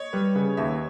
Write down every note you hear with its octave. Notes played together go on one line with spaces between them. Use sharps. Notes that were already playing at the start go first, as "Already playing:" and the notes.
Already playing: C#5 D#5
G3 B4
C#3 B4
D#2 E5